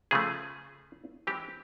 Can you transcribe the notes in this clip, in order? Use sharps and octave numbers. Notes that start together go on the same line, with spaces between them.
C#3 F3 A3 G#4
E3 G#3 C4 D#4 G4